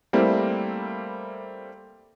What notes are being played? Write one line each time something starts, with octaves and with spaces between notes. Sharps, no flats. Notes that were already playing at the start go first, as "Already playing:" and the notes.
G3 A3 A#3 C4 E4